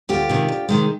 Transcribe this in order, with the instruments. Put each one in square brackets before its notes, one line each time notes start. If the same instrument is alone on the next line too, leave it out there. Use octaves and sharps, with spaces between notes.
[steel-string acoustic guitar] D2 F4 G4
C3 D#3 G#3
D2
C3 D#3 G#3